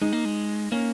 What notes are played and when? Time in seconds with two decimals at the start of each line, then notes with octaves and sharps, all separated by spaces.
0.02 G#3 D#4
0.13 A#3
0.25 G#3
0.72 A#3 C#4